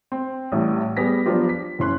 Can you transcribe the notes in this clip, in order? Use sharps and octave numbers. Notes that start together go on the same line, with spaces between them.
C4
A1 A2 G3
G3 B3 G#4 A#6 B6
F3 F#3 B3 D4 F4 G4
B6
F#1 E3 C#4 C6 F#6